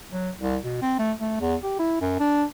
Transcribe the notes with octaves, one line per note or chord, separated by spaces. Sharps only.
F#3
C2
B2
C4
A3
A3
E2
G4
E4
F#2
D4